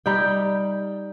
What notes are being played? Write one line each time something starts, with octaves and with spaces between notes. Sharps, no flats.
G3 D#4 G5